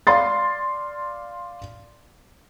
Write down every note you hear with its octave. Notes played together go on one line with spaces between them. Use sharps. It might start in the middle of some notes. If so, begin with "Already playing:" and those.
D5 F5 C6 A6